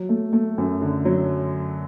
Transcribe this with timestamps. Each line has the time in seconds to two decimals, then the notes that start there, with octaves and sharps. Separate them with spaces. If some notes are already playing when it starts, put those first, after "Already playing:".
Already playing: F#3
0.09 A3
0.33 A3
0.58 F#2
0.81 D3
1.05 F#3